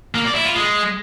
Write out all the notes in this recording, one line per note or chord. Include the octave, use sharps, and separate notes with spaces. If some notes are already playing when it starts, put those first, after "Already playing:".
A#3
D5
E4
F4
G#3